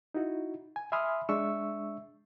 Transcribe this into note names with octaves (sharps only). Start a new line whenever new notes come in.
D#4 E4 F#4
G#5
E5 G#5 B5 C6 D#6 F6
G#3 D4 E5 C#6 E6